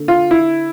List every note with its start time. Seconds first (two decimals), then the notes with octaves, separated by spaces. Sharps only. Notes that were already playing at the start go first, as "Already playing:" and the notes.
Already playing: D3 A#3
0.08 F4
0.31 E4